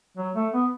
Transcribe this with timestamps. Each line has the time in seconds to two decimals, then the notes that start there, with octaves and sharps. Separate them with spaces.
0.17 F#3
0.35 A3
0.53 B3